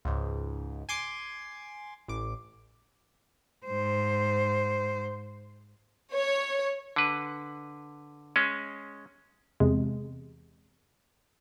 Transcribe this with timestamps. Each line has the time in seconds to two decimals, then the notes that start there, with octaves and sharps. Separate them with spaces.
0.05 C#2 G#2
0.89 G#5 C6 D6
2.08 A1 D6
3.66 G#2 C5
6.14 C#5
6.96 D3 B4
8.36 G#3 C#4
9.60 E2 C3 G#3